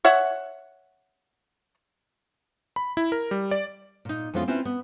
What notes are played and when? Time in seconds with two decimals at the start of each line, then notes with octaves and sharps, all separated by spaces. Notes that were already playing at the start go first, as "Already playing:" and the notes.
0.04 C#5 E5 F#5
2.76 B5
2.97 E4
3.12 A#4
3.31 G3
3.51 D5
4.05 A#2 D#4
4.34 F2 E3 G#3 B3 C#4 F4
4.48 C4 C#4 E4 F4 B4
4.65 B3